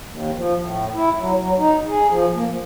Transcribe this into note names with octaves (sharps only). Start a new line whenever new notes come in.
D#2
F3
A2
E4
F#3
F#3
D#4
G#4
F3
A#3
F3